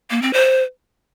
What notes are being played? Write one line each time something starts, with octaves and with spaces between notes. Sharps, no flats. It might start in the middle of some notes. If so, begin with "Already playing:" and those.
A#3
C4
C5